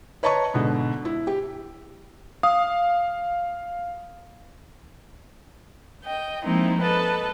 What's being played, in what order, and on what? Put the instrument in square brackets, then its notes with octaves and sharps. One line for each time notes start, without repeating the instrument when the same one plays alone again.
[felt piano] B4 C#5 D#5 A5 A#5 C#6
G#2 B2 D3
E4
G4
[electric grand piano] F5 [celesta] D#6
[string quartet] D#5 G5
F3 G#3 A#3 C4 D#4 E4
A4 B4 D#5 A5